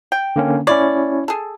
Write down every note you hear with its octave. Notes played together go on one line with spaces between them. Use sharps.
G5
D3 A#3 C#4
C#4 E4 C#5 D5
G#4 A4